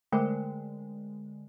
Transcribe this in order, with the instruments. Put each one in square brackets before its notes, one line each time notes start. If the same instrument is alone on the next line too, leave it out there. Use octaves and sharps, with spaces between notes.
[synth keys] D3 G#3 [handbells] A3 D6 [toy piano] A#4 C5 G5